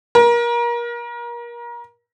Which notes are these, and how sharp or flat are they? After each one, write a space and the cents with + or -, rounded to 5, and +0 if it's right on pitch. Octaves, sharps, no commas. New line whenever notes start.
A#4 +30